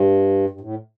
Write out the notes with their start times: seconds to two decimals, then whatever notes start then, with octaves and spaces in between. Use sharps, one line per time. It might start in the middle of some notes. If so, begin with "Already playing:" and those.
Already playing: G2
0.50 G2
0.61 A2